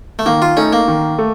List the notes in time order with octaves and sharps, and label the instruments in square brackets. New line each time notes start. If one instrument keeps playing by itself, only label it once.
[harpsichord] A3
[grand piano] D#3 [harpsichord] A#3
[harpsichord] F4
[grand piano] A3 D#4 [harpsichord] C#4
[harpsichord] A#3
[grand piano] D#3
A3